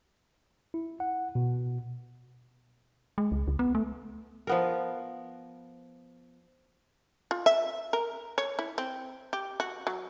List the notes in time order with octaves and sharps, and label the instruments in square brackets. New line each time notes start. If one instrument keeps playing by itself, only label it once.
[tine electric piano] E4
F#5
B2
[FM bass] G#3
C#2
C#2
B3
A3
[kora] F3 B3 A#4
[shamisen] F4
E5
A#4
C#5
E4
C4
G4
F#4
F#3